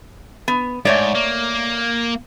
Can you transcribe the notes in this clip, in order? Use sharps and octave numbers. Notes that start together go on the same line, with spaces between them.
B3
G#2 A3 C#5 D5
A#3